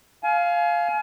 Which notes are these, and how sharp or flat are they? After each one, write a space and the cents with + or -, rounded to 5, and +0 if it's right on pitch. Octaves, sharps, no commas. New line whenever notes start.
F5 +0 G#5 +35